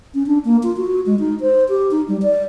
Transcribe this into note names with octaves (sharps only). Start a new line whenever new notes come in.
C#4
D4
A#3
F4
F#4
G#3
D#4
C5
G4
D#4
G3
D5